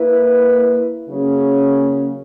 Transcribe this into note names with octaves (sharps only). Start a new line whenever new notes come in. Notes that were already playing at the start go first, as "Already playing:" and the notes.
Already playing: A#3 E4 B4
C#3 F#3 A#3 C#4 G#4